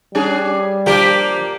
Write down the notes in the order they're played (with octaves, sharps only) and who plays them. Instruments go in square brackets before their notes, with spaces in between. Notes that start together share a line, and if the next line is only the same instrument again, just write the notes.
[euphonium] G3 [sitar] C#4 D4 G#4
[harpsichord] F3 D4 [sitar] A#3 G4 A#4